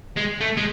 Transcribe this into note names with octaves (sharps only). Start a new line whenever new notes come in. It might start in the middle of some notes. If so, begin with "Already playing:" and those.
G#3
A3
G#3